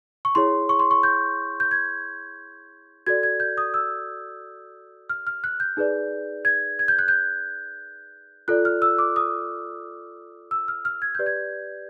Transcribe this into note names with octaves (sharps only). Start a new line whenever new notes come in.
C#6
E4 G#4 C#5 C6
C#6
C6
C#6
G6
G6
G#6
F#4 A4 D5 G#6
G#6
G6
D#6
E6
F6
F6
F#6
G6
D#4 G#4 B4 D5
G#6
G#6
G6
F#6
G6
F4 A4 D5 F#6
F6
E6
D6
D#6
E6
F6
F6
G#6
G4 B4 D5 G6
G#6